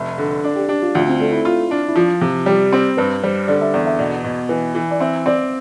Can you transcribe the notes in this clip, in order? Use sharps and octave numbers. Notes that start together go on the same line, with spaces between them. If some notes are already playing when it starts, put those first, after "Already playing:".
Already playing: F1 E5
D3
D4 D5
G4
D4 G4
F4
D2 F4
C4
A3 D4
E4
F4
D4
E4
F3 F4
C3
G3 G4
C4
G2 B4
G3 C5
D3 D5
E5
E2 D5
E5
B2 D5
B2
E3 B4
E3
D5
C4 E5
C4 D5